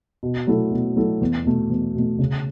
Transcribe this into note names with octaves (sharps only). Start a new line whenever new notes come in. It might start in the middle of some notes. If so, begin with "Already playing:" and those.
B2
F#3 A3 E4 A4
B2
F#3 A3 E4 A4
E2
B2 A3
E2
B2 A3
C#3